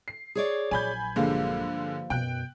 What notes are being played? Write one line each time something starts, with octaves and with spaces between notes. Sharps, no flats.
C7
G#4 C#5 D5
A#1 F#3 G#5 B5 G6
G2 D3 F3 G#3 A#3
F#2 B2 G5 F#6